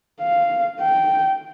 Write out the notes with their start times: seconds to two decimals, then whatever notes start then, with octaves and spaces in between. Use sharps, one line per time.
0.21 F5
0.81 G5